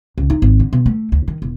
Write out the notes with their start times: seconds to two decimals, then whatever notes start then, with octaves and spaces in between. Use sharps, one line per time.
0.18 C#2
0.30 D#4
0.42 G#1
0.60 D3
0.73 B2
0.86 A3
1.12 D2
1.28 D#3
1.42 E1